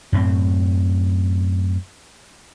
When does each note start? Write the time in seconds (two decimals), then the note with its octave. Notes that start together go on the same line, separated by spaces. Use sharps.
0.12 F#2 A2 A#3 C4